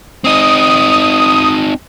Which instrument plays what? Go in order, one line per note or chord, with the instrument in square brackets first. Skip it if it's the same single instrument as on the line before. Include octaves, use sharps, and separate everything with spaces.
[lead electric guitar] C4 D#4 [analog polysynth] D#6